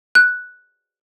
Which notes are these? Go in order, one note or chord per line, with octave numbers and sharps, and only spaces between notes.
F#6